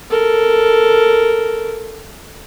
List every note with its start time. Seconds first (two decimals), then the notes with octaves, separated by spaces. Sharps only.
0.11 A4 A#4